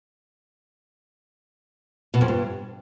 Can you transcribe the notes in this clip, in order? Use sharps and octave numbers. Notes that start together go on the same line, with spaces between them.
B2
F2
G2